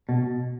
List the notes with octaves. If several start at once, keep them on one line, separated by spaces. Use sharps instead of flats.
B2